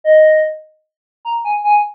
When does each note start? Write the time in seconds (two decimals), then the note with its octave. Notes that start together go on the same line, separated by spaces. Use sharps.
0.04 D#5
1.25 A#5
1.44 G#5
1.64 G#5